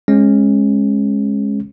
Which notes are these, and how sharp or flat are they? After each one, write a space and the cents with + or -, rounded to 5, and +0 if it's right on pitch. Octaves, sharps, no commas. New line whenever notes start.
G#3 +0 C#4 -25